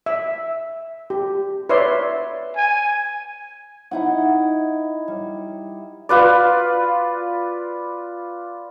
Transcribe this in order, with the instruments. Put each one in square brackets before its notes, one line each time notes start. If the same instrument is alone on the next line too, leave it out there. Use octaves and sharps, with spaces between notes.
[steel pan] E5
G4
B4 C#5 D5 E5 C6
[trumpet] G#5
[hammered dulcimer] D#4 E4 F#5
G3
[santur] F4 B4 D5